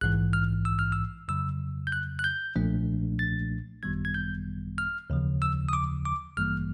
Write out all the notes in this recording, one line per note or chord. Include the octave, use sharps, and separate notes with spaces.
A#1 G#2 E3 F#6
F6
E6
F6
E6
F2 C#3 F#3 E6
G6
F#6
F#6
G6
B1 A#2 F3 A3 D4
A6
G#1 F#2 D#3 G3 B3 G#6
G#6
G6
F6
D#2 C#3 F3
E6
D#6
D6
D6
A1 G2 E3 G3 A#3 F6